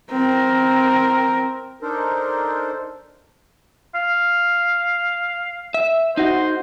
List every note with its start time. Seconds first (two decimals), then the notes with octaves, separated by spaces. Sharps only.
0.10 C4 A#4
1.81 D4 D#4 A4 A#4 C5
3.95 F5
5.74 E5
6.17 D#4 F#4 C5